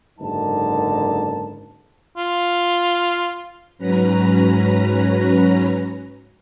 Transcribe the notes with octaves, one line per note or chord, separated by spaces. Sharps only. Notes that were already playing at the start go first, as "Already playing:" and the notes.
F#1 G#2 D3 D#4 A#4 A5
F4
G#2 F#3 C#4 B4 A#5